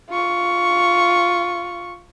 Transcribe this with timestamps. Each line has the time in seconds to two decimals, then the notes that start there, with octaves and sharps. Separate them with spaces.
0.10 F4 C#6